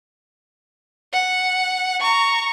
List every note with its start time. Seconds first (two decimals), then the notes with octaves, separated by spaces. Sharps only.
1.14 F#5
2.01 A#5 C#6